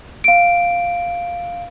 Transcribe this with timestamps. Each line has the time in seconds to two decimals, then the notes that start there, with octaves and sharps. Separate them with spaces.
0.24 F5 D7